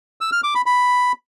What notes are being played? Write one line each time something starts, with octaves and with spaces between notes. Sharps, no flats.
E6
F6
D6
B5
B5